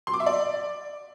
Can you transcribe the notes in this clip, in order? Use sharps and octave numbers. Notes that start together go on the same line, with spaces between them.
C6
D6
E5
D5